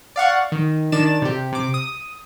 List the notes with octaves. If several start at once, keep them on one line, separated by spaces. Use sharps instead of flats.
D5 F5 F#5 C#6
D#3
D#3 D4 D5 A6 E7
C3 G4
C3 D6
D#6